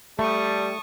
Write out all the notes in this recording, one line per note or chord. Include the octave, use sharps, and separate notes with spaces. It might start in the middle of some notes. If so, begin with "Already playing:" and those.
G3 A3 A5 C#6 D#6